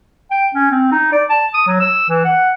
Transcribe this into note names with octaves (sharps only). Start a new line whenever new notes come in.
G5
C#4
C4
D#4
D5
A5
D#6
F#3
E6
E3
F#5